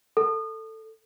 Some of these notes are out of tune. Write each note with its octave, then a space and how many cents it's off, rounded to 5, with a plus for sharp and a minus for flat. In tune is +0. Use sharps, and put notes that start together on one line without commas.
A4 +10